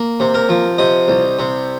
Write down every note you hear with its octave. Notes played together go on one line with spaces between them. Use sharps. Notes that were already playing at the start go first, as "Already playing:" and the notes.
Already playing: A#3
C3
A#4
F3
C3 D#5
C2
C3